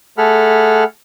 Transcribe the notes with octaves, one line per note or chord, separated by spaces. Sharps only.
A3 G#4 A4 F#5 B5 F6